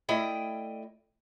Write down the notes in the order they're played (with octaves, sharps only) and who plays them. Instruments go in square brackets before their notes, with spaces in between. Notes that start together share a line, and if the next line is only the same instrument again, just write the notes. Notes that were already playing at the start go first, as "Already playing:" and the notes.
[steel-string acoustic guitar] A3 E4 D5 D#5 G5